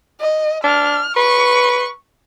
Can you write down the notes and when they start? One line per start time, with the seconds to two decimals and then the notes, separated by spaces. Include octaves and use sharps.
0.20 D#5
0.64 D4 F6
1.16 B4 C#6